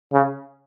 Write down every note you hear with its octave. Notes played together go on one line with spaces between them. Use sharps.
C#3